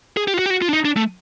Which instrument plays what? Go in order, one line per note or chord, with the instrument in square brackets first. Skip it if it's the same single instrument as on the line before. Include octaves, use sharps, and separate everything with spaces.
[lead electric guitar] G#4
G4
F4
F#4
G4
F#4
F4
D4
D#4
D4
A3